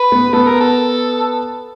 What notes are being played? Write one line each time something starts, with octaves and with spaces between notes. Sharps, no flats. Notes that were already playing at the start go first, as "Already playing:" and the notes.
Already playing: B4
B3
B3 A4
A#4
A4